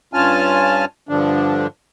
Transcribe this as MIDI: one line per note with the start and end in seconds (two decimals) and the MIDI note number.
0.14 0.85 43
0.14 0.85 61
0.14 0.85 65
0.14 0.85 80
0.14 0.85 81
0.14 0.85 89
1.09 1.67 43
1.09 1.67 50
1.09 1.67 53
1.09 1.67 62